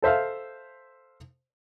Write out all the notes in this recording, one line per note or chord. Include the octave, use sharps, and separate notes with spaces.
A4 C5 E5 F5